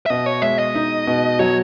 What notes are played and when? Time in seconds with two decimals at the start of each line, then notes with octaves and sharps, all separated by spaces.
0.06 E5
0.10 B2 D#5
0.26 C#5
0.42 G#3 E5
0.59 D#5
0.75 D#4
1.07 B2
1.39 F#3 C#5